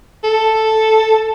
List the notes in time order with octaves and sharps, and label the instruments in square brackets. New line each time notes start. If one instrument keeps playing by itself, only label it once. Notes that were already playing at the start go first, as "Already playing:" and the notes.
[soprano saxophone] A4